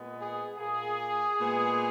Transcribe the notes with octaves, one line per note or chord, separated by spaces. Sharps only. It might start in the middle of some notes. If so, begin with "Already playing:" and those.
Already playing: A#2 G#3 B3
G#4
A#2 A#3 G#4
A#2 G#3 B3